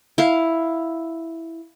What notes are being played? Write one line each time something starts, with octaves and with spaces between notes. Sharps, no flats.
E4 F5